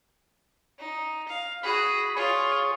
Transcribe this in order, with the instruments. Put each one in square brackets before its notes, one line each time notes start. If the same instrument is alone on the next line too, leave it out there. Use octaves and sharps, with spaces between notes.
[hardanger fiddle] D#4
F5
[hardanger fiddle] F#4 G#4 [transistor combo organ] B5
[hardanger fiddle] F4 [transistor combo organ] G#4 C#5